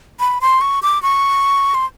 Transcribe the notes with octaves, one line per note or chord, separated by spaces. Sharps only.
B5
C6
C#6
D6
C#6
C6